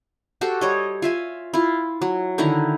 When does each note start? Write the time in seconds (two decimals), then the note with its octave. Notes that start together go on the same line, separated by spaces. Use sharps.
0.41 F#4 G4 A4 C5
0.61 G3 C#5 D#5
1.02 F4 E5 G#5
1.54 E4 F4
2.02 F#3
2.38 D3 D#3 E4 A#5